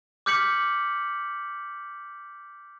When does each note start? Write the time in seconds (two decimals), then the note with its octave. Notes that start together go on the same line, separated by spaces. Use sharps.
0.26 D6 F6 G6 B6 C#7 F#7